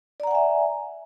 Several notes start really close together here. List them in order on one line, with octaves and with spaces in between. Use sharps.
D5 A#5 F#5 G#5 E5